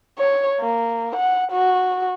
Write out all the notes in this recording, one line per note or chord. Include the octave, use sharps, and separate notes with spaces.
C#5
A#3
F#5
F#4